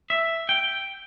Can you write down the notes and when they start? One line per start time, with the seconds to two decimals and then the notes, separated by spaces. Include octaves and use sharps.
0.10 E5
0.49 G5